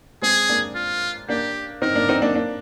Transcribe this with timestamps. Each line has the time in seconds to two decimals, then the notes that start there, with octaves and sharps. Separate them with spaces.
0.22 G#3 C4 G#4
0.49 A#3 D4
0.75 F4
1.29 A#3 D4 G4
1.82 C4 D#4 A#4
1.95 A#3 D4
2.09 C4 D#4
2.22 A#3 D4
2.35 A#3 D4